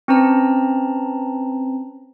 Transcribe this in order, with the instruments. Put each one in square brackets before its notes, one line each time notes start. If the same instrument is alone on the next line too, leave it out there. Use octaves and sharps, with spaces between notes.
[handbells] C4 C#4 B4 A5 A#5